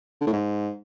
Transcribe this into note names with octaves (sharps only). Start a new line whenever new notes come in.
D3
A2
G#2